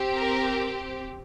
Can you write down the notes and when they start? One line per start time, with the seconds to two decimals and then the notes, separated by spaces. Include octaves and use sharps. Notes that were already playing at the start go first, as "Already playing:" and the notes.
Already playing: C4 G4
0.15 A#4